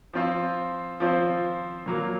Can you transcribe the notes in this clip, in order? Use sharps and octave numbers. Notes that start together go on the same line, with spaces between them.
F3 C4 F4 C5
F3 C4 F4 C5
A#2 F#3 A#3